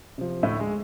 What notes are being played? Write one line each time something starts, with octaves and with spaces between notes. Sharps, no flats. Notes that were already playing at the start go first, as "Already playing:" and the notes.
C3 F3
D2 A2 A3
G#3